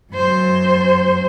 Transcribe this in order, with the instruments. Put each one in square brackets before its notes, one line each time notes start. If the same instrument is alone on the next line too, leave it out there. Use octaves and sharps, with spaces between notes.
[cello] F#2 C5